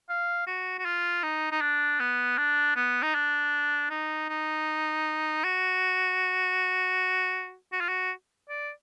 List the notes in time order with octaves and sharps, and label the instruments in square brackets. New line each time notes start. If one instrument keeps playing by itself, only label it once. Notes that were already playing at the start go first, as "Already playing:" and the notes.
[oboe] F5
F#4
F#4
F4
D#4
D#4
D4
B3
D4
B3
D#4
D4
D#4
D#4
F#4
F#4
F4
F#4
D5